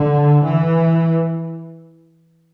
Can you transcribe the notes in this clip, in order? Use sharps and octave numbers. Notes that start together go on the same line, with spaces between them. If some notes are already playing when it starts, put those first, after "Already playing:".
Already playing: D3
E3